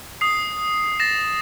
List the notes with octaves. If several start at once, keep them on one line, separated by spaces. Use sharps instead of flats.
D#6 C7
A6 A#6 E7